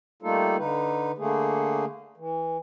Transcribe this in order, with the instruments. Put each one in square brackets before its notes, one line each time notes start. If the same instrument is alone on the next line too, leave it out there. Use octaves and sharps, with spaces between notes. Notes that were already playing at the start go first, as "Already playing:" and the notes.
[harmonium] G3 A3 A#3 D#4 F4 A4
D3 D#4 B4
D3 A3 A#3 G#4
E3